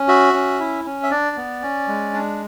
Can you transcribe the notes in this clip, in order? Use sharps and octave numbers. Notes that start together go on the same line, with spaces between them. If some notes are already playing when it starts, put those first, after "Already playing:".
Already playing: C#4
F#4 E5
C#4
E4
C#4
E5
D4 D5
B3
C#4
G#3
D4